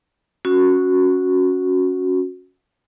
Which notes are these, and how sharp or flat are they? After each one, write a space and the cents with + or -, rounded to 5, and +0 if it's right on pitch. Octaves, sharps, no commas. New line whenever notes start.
C#4 +0 F#4 -10